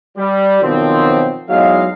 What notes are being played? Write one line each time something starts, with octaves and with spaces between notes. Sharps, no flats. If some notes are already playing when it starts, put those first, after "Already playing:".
G3
B2 D#3 F3 F#3 C4
E2 F#3 G#3 D#4 F5